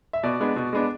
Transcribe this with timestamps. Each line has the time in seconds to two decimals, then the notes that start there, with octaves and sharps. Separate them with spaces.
0.13 E5
0.23 B2 D5
0.40 G#3 B3 D4
0.56 B2
0.73 G#3 B3 D4